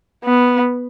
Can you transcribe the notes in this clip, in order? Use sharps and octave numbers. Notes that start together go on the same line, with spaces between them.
B3